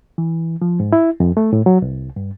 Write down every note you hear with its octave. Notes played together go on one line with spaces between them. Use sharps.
E3
F3
G#2
E4
F2
A3
A2
F#3
C2
G2